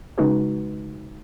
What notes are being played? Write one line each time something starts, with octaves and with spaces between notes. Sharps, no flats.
C#3 G#3 D#4 F#4 B4